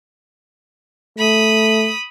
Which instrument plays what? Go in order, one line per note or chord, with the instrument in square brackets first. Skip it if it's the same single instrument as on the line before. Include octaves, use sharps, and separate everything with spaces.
[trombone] A3 [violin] B5 D#6